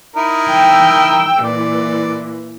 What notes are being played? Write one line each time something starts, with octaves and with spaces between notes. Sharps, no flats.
D#4 E4 A#4
G5 E6
A#2 E3 D5